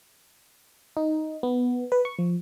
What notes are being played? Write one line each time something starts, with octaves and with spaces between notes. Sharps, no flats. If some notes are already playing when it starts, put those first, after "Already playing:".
D#4
B3
B4
C#6
F3